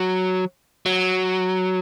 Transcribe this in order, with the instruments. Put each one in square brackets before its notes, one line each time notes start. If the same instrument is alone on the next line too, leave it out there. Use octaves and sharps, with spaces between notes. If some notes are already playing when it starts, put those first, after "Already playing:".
Already playing: [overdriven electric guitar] F#3
F#3